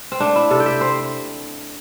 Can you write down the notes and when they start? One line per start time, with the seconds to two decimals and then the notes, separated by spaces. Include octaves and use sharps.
0.12 C4
0.20 A3 D4
0.36 E4
0.50 C3 A4
0.60 G5
0.66 E5
0.81 C4 C5